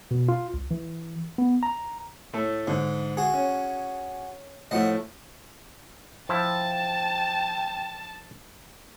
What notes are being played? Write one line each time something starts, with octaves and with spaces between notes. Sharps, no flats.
B2
F4
C2
E3
B3
A#5
A2 A3 A4
G#2 D3
F#4 G#4
C#4
A2 F3 A3 D#5 F#5
F3 E4 G5 A5